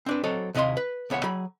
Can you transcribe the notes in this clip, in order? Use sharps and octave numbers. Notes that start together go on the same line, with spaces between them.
C4 D4 B4
F#3 C4 A4 C#5 D#5
D#2 C3 E4 D#5 F5 C6
B4
C#2 B3 C#5 E5 F#5
F#3 G#4 B5